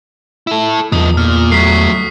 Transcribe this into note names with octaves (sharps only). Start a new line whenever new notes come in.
E4 A4
E2 F3 D#4 D#6
A#2 F6
F#3 A3 C#6 B6 C7